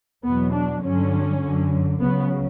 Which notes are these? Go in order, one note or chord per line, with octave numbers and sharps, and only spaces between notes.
E2 B2 F#3 B3
D4
G2 D3 F#3 C#4
F#2 D3 F#3
C#2 C#3 F#3 B3